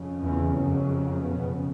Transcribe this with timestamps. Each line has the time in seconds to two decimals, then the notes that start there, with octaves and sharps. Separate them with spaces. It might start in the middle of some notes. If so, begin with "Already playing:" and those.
Already playing: F2 C#3
0.22 E2 E3
0.55 F#2 F#3
1.20 B2 B3